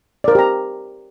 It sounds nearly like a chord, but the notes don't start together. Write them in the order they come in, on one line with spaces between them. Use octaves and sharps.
D5 A#4 C5 G4 A#5